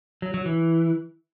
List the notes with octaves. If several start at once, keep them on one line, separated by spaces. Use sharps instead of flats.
F#3
F#3
E3